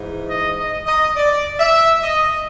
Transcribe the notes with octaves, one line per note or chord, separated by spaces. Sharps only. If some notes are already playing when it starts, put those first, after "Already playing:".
Already playing: G#2 E3
D#5
D#5
D#5
D5
E5
D#5